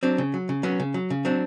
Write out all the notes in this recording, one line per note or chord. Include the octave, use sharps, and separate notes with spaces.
F#3 C4 D4
C#3
F#3
C#3
F#3 B3 C#4
C#3
F#3
C#3
F#3 C4 D4